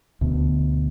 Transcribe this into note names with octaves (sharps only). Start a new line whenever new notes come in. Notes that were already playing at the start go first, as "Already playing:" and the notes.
D2 B2